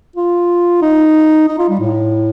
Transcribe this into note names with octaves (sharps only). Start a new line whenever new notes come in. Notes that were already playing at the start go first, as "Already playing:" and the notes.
F4
D#4
D#4
F4
G3
A2